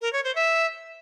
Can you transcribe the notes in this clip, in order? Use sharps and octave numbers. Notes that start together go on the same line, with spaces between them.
A#4
C#5
C5
E5